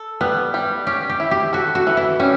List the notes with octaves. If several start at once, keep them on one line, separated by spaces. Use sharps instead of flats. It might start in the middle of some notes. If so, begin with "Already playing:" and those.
Already playing: A4
G3 B3
G3
C#4 G4
G4
E4
G4
F#4 A4
F#4
E3
E4
G3 C#4